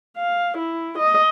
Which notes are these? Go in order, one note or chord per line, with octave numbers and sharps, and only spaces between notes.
F5
E4
D#5